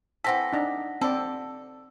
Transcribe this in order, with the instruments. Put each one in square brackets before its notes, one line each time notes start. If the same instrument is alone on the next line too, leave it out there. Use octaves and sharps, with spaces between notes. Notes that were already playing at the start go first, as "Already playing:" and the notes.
[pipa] E3 C4 A4 [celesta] F#5 A#6 B6
[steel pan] D4 D#4
[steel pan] C4 D5 [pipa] A4